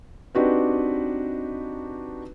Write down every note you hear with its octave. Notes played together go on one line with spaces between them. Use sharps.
C4 D4 D#4 F#4 G4 B4